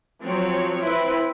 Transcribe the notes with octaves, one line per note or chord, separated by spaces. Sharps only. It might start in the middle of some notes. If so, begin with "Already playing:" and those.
F3 F#3 C4 C#5
C4 E4 B4